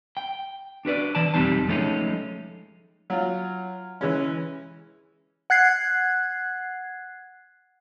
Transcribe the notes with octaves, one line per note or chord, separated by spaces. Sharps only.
G5
D4 F#4 B4 D5
E3 D5 A5
B1 F2 G3 C4 D#4 A5
F3 G#3 A3 C#4 D#4 F4
F#3 F4
E3 G#3 C#4
F#5 F#6 G#6 C7